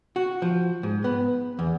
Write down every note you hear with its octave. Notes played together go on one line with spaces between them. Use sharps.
F#4
F3
G#2
B3
E2